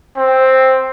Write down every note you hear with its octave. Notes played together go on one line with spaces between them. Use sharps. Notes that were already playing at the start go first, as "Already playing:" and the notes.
C4